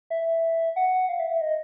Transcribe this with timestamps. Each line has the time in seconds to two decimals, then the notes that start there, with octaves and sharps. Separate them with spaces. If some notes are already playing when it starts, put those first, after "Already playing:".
0.10 E5
0.76 F#5
1.09 F5
1.19 E5
1.30 E5
1.41 D#5